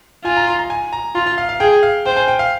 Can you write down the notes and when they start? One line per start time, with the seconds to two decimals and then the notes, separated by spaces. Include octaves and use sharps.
0.25 F4 G#5
0.37 A#5
0.47 C6
0.59 A#5
0.70 G#5
0.93 A#5
1.15 F4 C6
1.26 C6
1.38 F5
1.49 F5
1.60 G#4 G5
1.83 F5
2.05 C5 G5
2.16 G#5
2.28 G5
2.39 F5